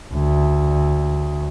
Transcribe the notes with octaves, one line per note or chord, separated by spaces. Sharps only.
D2